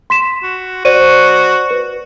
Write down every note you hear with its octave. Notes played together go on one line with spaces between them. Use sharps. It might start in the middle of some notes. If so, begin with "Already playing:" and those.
C6 B6 E7
F#4
F#4 C5 D5 D#7
B4